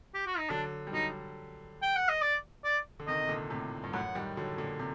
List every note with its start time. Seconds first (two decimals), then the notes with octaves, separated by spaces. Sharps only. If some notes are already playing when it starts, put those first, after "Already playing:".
0.14 G4
0.27 F#4
0.38 D#4
0.50 D3 F#3 D4
0.87 G3
0.93 D3 F#3 D#4
1.82 G5
1.96 F#5
2.09 D#5
2.22 D5
2.64 D5
3.00 D3
3.07 C3 D#3 D#5
3.23 C3
3.29 A#2 D3
3.50 A2 C3
3.83 G2
3.93 F#2 A2 F#5
4.15 D#3 G3
4.37 D3 F#3
4.58 A#2 D3
4.79 C3